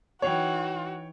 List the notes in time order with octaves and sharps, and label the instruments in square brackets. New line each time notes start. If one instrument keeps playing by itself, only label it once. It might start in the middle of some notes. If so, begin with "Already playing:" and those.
[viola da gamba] E3 D#4 [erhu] F#4 [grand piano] C#5 G5